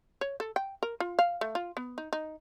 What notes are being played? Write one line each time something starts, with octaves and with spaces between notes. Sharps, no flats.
C#5
A4
G5
A#4
F4
F5
A3
F4
B3
D#4
D#4